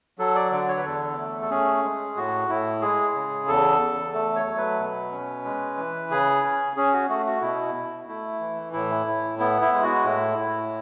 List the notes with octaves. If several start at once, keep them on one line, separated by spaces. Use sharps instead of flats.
F#3 A4
D5
D3 D5
C#5
B4
E2 A4
A3
A4
C#4 G#4
G#3
A2 F#4
A2 E4
G#3 G#4
C#3
E2 A4
E2
A3 A4
C#5
F#3
B4
B2
C#4
G#3
E3
C#3 G#4
C#4
C#4 G#4
F#4
A3 F#4
F#4
B2 E4
B2
A3 E4
E3
A2 E4
A2
B3 E4
E4
G#3
F#4
A2 E4
A2